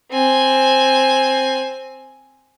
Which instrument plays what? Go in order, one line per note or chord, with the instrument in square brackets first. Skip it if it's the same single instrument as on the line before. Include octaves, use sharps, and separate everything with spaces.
[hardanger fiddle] C4 G#5